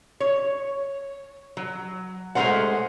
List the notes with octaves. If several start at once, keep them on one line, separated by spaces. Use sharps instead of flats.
C#5
F#3
G#3 A3 C4 A#4 C5 F#5